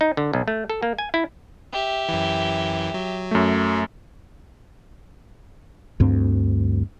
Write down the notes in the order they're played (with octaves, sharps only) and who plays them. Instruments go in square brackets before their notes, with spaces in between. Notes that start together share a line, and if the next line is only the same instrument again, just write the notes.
[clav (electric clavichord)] D#4
D3
B1
A3
A4
A#3
G#5
E4
[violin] G4 E5
[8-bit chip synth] F#2 E3
F#3
[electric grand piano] F#2 A3
[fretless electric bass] D2 G2 D3 C4